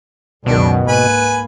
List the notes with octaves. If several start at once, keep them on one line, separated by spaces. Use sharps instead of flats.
C#2 F#2 B2 D#3 D4
G#2 A#3 B4 G#5 B5